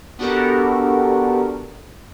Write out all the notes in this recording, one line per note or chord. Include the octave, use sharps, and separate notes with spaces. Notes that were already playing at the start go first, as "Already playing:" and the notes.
B3 D4 F#4 G4 A4 A#4